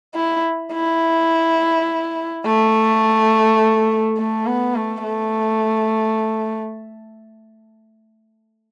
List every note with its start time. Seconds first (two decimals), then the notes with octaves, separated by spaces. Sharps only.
0.15 E4
0.73 E4
2.46 A3
4.17 A3
4.46 B3
4.75 A3
5.03 A3